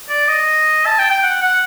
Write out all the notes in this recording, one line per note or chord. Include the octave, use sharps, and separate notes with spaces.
D5
D#5
A5
G5
G5
F#5
F#5